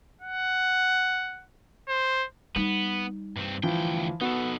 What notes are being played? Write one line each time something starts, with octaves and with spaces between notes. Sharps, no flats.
F#5
C5
G3 B3 D#4
G2 C4
D2 E3 F3 G5
B3 D#4 F#4 A4